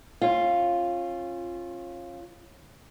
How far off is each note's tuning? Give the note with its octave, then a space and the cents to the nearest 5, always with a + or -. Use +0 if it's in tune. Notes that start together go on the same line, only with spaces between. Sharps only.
C#4 -30 F4 +0